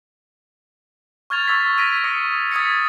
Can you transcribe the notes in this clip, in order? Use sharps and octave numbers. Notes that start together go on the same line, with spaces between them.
C#6 F6 G#6 A6 F7
C#6 E6 A6 B6
A#6 B6 D7 D#7
C#6 D#6 A#6 C#7
D#6 G#6 A6 B6 C#7